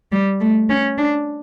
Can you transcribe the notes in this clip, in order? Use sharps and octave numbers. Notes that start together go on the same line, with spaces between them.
G3
A3
C#4
D4